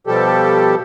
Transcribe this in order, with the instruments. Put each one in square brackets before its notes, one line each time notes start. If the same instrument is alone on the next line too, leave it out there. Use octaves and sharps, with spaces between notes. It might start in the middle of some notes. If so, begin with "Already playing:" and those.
[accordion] B2 F3 G3 G4 A4